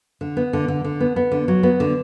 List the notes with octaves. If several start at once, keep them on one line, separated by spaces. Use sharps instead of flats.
D3
B3
D3
D3
D3
B3
B3
D3
F#3
B3
D3